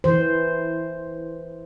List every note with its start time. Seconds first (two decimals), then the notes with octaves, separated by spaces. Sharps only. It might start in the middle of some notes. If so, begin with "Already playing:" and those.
0.04 E3 C5